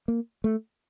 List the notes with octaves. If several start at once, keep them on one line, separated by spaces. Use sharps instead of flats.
A#3
A3